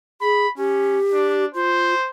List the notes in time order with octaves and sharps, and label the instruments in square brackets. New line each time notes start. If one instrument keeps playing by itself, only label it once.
[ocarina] G#4 [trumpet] B5
[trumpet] C#4 [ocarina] G4
[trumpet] D4
[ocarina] F4 [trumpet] C5